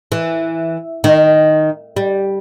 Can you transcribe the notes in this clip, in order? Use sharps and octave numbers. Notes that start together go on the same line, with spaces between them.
E3
D#3
G3